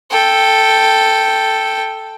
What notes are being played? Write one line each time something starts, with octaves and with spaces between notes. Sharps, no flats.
A4 G5